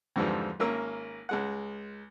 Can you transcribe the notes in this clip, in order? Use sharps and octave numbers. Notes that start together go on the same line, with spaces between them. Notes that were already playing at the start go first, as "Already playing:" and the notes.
F2 G#2 D3 E3 F3 G3
G#1 A#3 C#4 A#4 E6
C#2 G#3 F#5